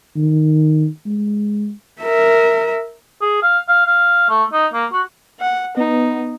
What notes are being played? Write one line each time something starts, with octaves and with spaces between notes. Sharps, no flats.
D#3
G#3
A#4 E5
G#4
F5
F5
F5
A3
D#4
A#3
F#4
F#5
B3 D#4